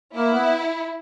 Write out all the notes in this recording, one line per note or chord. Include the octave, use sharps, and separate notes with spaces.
A#3 E4
B3